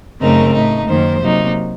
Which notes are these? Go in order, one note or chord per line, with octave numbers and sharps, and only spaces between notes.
F#2 C#3 A3 C4 D#4 A#4
A2 A3 D#4
F#2 D#3 A#3 C5
C3 F#3 A#3 D#4